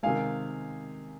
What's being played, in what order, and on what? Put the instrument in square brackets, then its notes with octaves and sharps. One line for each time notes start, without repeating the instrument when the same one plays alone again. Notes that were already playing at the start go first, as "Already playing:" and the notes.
[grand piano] C3 D#3 G#3 F5 G#5